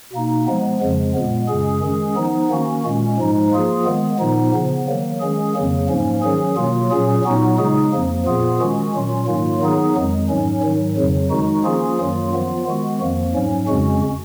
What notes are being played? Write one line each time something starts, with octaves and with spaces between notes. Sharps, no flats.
B2 A#3 D#4
F3 G#3 B3
F2 C#3 F3 G#3
A#2 G#3 B3
F#2 C#3 G#3 C#4 G#4
D#3 G#3 C#4 G#4
F3 B3 D#4
D#3 A#3 C#4 F#4
A#2 G#3 C#4
G#2 F3 G#3 D#4
F3 A#3 F4 G#4
D#3 G#3 B3
A#2 F3 B3 D#4
C#3 F3 B3
D#3 F#3 A#3
D#3 G#3 C#4 G#4
F2 C#3 F#3 A#3
G#2 F3 A#3 C#4
D#3 F#3 C#4 G#4
B2 F#3 A#3 F4
A#2 F#3 C#4 G#4
A#2 F#3 B3 D#4 F#4
C#3 G#3 D#4 G#4
F2 F3 A#3
A#2 F3 B3 F4 G#4
D#3 G#3 C#4 F#4
A#2 F#3 C#4 F4
G#2 D#3 F#3 A#3 F4
D#3 F#3 B3 D#4 G#4
F2 D#3 G#3
G#2 F#3 C#4
G#2 D#3 F#3
F2 C#3 F#3
D#3 G#3 D#4 F#4
F3 A#3 C#4 F4 G#4
F#2 D#3 F#3 A#3 F4
F3 B3 F4
D#3 G#3 B3 F#4
F2 F3 A#3
G#2 F#3 C#4
F2 C#3 G#3 C#4 F#4